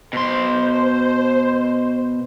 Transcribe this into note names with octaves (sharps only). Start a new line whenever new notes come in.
B2 C5 C6